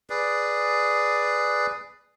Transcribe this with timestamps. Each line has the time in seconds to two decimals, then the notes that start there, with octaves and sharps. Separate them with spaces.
0.10 G#4 B4 D5